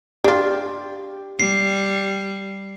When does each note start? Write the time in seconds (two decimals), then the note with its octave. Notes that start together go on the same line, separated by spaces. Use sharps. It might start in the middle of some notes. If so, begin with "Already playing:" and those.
0.24 D4 F4 G4
1.40 G3 C7